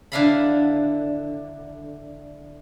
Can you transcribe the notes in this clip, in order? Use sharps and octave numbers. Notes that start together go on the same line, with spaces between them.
D3 D4 E4 F5 A#5 B5